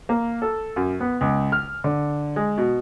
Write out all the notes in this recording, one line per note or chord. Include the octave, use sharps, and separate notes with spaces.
A#3
A4
F#2
B3
C#2
F6
D3
G#3
B2